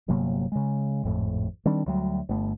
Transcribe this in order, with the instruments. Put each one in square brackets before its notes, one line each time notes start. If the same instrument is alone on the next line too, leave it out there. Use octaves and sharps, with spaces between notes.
[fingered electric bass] G1 C3 F#3 A#3
C#3 G#3
G#1 F2 A2
D#3 G3 C4 D4
D2 F#3 G3
G1 A3